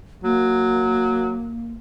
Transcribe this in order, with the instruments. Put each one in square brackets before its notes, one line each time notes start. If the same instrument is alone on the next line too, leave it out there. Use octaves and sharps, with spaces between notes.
[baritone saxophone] F#3 [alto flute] A#3